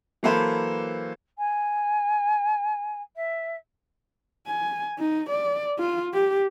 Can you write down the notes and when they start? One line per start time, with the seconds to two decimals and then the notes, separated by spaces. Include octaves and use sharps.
0.23 E3 F#3 A#3 A4 B4 C5
1.38 G#5
3.15 E5
4.47 G#5
4.99 D#4
5.30 D5
5.79 F4
6.14 G4